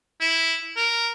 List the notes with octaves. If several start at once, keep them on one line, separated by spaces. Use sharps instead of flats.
E4
A#4